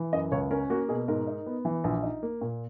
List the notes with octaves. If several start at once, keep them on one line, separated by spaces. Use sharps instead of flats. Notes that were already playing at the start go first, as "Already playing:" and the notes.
Already playing: E3
F#2 D#5
C#2 C#5
C#4 A#4
A#3 F#4
B2 G#4
G#2 A#4
D#4
B3
E3
A#1
D#4
A#3
A#2